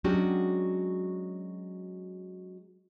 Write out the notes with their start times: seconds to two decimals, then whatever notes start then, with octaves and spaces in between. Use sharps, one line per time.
0.04 F#3 G#3 C#4 D4 F#4 G4